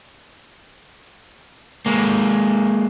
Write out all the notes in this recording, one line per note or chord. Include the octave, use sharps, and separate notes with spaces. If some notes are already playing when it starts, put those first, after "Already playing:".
G#3 A#3